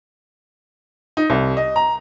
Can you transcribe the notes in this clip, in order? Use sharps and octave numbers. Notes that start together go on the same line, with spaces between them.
D#4
C2
D#5
A#5